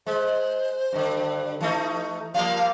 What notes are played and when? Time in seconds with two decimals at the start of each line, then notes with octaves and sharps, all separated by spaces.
0.06 G#3 C5
0.92 G2 D3
1.60 E3 A3 D#4
2.34 F3 G3 A#3 F5